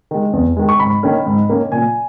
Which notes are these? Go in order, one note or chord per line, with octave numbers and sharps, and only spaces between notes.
D#3 G#3
E2
D#3 G#3
C#6
G#2 B5
D#3 A#3 C#4
G#2
D#3 A#3 C#4
A#2 G#5